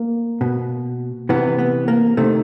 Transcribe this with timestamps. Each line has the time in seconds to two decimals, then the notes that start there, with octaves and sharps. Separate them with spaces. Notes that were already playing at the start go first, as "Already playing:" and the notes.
Already playing: A#3
0.41 B2
1.29 C3 E3 B3
1.59 B3
1.88 A#3
2.17 C3 D#3 A3